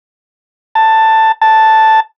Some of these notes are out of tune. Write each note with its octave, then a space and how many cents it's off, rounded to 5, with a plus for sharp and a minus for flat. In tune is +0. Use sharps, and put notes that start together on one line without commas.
A5 +10
A5 +0